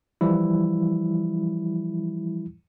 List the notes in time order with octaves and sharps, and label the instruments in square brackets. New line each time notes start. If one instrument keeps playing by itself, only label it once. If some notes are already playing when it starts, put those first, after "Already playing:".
[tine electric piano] E3 F3 G3 E4